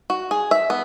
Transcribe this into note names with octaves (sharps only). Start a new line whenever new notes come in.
F#4
G#4
E5
B3